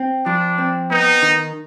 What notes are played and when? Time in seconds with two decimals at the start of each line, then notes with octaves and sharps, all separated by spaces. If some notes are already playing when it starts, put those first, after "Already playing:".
Already playing: C4
0.26 F3 D4
0.58 C4
0.91 B3 D#4
1.22 D#3